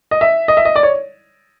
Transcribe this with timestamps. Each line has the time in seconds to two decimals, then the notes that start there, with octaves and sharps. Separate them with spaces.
0.11 D#5
0.21 E5
0.48 D#5
0.57 E5
0.65 D#5
0.76 D5
0.83 C#5